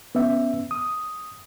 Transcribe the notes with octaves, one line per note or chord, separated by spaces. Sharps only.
B3 C#4 E5
D#6